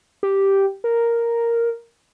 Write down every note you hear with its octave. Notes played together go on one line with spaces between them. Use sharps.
G4
A#4